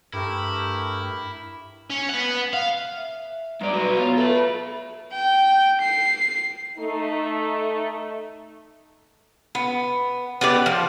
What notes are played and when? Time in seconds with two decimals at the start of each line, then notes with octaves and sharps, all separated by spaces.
0.13 G2 A3 E4 G4 A#4
1.90 C#4
2.09 B4 F#5
2.54 F5
2.96 E5
3.61 G2 D5 A#5
3.73 F#3 B4
3.97 B3 F4 C#5 A#5
4.17 A4 B4 E5 B5
5.13 G5
5.81 C7
6.77 A3 D#4
9.55 B3
10.41 B3 G4 D5
10.66 F3